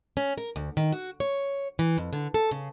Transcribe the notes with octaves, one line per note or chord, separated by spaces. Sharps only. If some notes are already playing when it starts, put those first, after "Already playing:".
C#4
A#4
D2
D#3
F#4
C#5
E3
F2
D3
A4
C#3